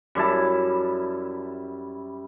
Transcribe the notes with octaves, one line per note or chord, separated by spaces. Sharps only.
F#2 G3 E4 A5